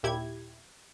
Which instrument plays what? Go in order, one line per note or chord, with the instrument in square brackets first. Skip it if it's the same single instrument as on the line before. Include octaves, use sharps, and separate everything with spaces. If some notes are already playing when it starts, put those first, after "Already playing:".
[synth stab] D#2 A#2 E4 G4 G#6